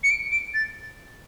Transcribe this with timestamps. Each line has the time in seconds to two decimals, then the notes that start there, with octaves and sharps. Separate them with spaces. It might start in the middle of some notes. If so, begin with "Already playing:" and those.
0.04 C#7
0.11 D7
0.32 D7
0.54 A6